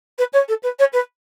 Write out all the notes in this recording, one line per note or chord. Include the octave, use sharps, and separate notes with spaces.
B4
C#5
A4
B4
C#5
B4